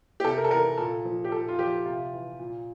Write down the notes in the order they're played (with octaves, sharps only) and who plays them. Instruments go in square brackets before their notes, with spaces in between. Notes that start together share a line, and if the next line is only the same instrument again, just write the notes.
[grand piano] G4
C3 A4
A#4
A4
E3 A#4
A#2 A4
F3
G4
A#2 A4
F4
F3 G4
C3 F4
E3
A#2